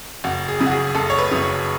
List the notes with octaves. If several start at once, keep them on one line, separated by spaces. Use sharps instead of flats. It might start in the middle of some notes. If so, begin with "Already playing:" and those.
F#1 F#4
G#4
F#2 C#3
F#4
G#4
F#1 A4
C#5
B4
F#2 C#3
C#5